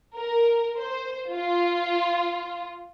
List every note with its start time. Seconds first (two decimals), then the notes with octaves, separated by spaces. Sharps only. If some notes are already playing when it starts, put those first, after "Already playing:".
0.15 A#4
0.78 C5
1.31 F4